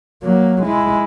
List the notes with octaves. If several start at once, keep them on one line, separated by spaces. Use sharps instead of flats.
F#3 A#3
G#3 E4